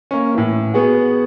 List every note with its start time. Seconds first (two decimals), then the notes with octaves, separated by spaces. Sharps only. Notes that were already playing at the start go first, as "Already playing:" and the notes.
0.11 A#3 C#4
0.34 A2 E3
0.74 B3 F#4 G#4 F#5